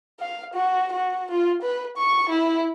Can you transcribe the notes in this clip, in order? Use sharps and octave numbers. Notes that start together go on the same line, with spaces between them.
F5
F#4
F#4
F4
B4
C#6
E4